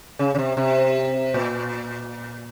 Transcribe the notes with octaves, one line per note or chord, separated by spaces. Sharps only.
C#3
C#3
C3
C3
A#2